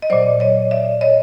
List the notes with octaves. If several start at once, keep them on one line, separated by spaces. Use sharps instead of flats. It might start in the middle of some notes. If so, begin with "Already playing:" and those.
D#5
A#2 F#3 C5 D5
C#5 D#5
D5 E5
C#5 D#5